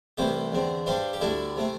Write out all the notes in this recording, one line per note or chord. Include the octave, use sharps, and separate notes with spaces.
C2 C3 E3 A3 G4 C5
E2 D3 C4
G2 G3 D4 G4 C5
G4
D2 D3 G3 D4 E4 A4
C3 A3 C4